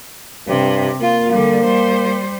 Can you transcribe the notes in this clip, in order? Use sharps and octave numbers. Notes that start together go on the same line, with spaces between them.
G2 C3
A#3 F4
D3 G3
G3 C5